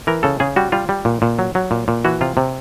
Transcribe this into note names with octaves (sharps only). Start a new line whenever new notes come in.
E3 A#4
C#3 A4
C#3 G#4
G3 F#4
G3 F4
G3
A#2
A#2
F#3
F#3
A#2
A#2
E3 F#4
C3 F4
C3